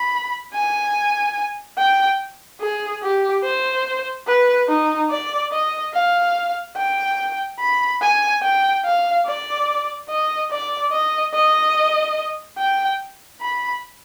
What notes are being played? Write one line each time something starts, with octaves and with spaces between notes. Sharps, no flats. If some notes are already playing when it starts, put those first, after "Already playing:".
Already playing: B5
G#5
G5
G#4
G4
C5
B4
D#4
D5
D#5
F5
G5
B5
G#5
G5
F5
D5
D#5
D5
D#5
D#5
G5
B5